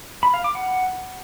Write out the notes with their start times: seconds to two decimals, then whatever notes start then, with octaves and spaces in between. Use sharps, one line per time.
0.23 B5
0.34 F5
0.44 D6
0.55 F#5